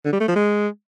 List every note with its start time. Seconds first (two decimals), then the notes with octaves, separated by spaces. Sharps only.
0.05 D3
0.13 G3
0.20 A3
0.28 F3
0.36 G#3